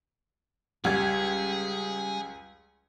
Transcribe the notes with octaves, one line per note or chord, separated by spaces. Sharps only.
C#2 G3 G#4 G#6